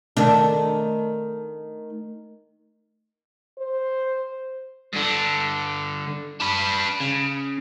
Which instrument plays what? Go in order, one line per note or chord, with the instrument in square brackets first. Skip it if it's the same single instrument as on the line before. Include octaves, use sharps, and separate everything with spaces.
[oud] D#3 A3 D4
[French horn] C5
[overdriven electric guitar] G2 D3
D4 B4
C#3